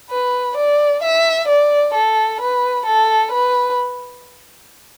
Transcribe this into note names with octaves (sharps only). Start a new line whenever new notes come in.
B4
D5
E5
D5
A4
B4
A4
B4